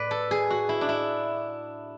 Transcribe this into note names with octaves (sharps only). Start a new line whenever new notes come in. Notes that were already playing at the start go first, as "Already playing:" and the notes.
Already playing: A2 B4 D5
A4
G#4
F#4
E4
D4
E4